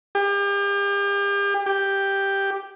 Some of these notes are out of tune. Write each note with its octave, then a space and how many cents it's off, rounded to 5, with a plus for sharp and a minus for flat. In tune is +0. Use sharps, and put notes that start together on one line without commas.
G4 +40
G4 +5